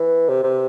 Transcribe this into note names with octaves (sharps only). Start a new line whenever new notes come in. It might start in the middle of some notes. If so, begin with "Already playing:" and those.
Already playing: E3
C3
C3